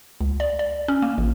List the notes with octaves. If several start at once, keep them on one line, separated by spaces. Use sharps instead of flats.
C#2
D5
D5
C#4
A#3
A1